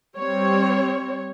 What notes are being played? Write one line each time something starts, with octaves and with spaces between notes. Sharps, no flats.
G3 C4 C#5